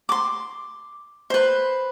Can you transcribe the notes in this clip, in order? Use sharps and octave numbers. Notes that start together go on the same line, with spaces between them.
C6 D6
B4 C5